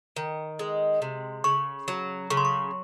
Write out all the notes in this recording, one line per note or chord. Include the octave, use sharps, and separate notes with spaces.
D#3
G#3
C3
C#3 C#6
F#3
C#3 C#6
C6
C#6